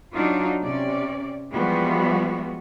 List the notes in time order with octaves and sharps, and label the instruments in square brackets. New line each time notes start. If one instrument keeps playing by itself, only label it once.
[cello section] F#3 D4 D#4 F4 F#4
C3 C#4 D5
E3 F3 G3 G#3 B3 F#4